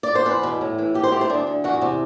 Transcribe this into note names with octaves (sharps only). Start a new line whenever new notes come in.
D5
C5
E2 B4
B2
A2
E3
B2 G4
C5
A3 G4
C5
D2 D4
D3
E2 F#4
C3